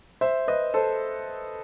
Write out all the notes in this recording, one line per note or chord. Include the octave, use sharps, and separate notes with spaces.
C5 E5
B4 D#5
A4 C5